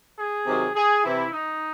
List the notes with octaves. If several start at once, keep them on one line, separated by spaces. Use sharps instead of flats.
G#4
C3 D#3 F#3
G#4
C3 E3 E4
D#4